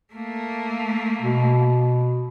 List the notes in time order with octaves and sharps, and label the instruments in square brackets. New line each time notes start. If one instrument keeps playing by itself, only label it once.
[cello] A3 A#3
[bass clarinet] B2